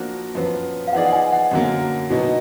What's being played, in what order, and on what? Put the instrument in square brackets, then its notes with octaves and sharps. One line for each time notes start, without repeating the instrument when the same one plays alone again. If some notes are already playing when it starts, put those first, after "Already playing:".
Already playing: [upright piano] F3 A#3 D4 F#4
F#2 F3 B3
[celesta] F5
[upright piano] F3 B3 D#4 G#4 D5 [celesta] F#5
[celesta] F#5
G#5
F#5
[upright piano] F#2 D3 F#3 A#3
B2 F#3 B3 D#4